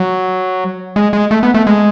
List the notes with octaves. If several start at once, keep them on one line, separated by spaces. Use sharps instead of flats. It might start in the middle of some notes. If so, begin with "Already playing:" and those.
Already playing: F#3
G#3
G#3
A3
B3
A3
G#3